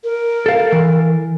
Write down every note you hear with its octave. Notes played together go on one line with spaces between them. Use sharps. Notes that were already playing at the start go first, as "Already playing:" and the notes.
A#4
A4 F5
E3